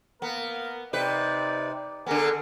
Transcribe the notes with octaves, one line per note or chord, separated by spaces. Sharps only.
A#3 B3 A#4
C3 D#4 B4 D5
D3 B3 G#4 A#4 G#5